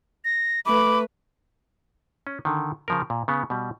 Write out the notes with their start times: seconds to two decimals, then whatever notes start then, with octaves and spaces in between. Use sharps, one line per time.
0.25 A#6
0.66 A3 B4 B5 D6
2.27 C#4
2.45 D3 D#3
2.88 C#3 F3 A#4
3.10 A#2
3.28 C#3 B3
3.50 B2 G3